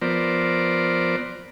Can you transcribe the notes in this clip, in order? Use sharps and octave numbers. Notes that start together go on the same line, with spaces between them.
F3 B3 A#4 C5 D5